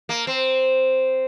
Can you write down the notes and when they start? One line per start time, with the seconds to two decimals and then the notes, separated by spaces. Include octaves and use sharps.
0.09 A#3
0.27 C4